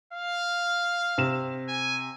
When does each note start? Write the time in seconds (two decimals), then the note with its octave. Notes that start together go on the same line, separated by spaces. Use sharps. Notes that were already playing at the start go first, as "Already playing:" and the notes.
0.13 F5
1.18 C3 E7
1.68 G#5